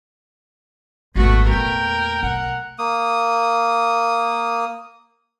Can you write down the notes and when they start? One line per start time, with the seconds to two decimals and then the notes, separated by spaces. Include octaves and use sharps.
1.15 D#1 G#1 A3 B3 F#4
1.50 E2 A#2 A#4 G5
2.23 B1 F#5
2.79 A#3 D#6